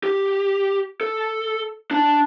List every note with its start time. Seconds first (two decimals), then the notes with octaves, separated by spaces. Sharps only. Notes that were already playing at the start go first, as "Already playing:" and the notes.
0.03 G4
1.01 A4
1.91 D4 A5